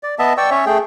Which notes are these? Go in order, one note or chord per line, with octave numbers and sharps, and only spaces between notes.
D5
B3 D#5 E5 A5
D5 G5 C#6 E6
C#4 C#5 E5
A3 G#4 G5